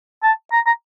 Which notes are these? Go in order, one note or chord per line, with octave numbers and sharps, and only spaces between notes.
A5
A#5
A#5